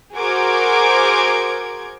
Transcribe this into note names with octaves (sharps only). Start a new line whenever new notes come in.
F#4 G#4 A#4 C5 D6 G#6